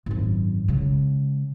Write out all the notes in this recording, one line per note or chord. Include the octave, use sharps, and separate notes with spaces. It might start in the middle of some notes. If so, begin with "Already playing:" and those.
G#1 F#2
C#3 G#3